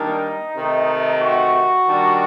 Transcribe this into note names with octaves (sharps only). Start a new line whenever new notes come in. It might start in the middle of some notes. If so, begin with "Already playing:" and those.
Already playing: D#3 G3 A#3 D4 D#4
C3 D#3 A3
F#4
D#3 G3 D4